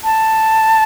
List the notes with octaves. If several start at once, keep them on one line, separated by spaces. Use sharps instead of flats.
A5